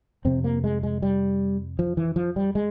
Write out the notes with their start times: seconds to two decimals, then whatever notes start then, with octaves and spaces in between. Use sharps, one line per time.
0.25 F2 C3 C4
0.44 A#3
0.64 G#3
0.83 G#3
1.02 G3
1.79 F3
1.97 E3
2.16 F3
2.36 G3
2.55 G#3